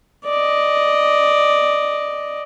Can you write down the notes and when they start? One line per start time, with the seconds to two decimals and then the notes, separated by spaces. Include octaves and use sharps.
0.25 D5 D#5